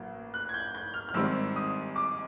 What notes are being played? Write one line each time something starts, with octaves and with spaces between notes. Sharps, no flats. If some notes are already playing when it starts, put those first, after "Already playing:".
Already playing: A1 F#3 A#3
F#6
G#6
G6
G6
F6
F6
G#1 G#2 D#3 G3 C4 E6
D#6
D6